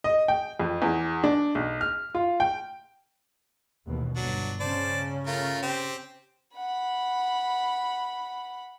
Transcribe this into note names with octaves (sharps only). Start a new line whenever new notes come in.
D#5
G5
F2
E2
D4
B1
F6
F4
G5
A1 D#2 B2
G1 F#3 D4
C#3 C#4 C5 D5 A5
A3 F4 A#4
C4 G4
F#5 B5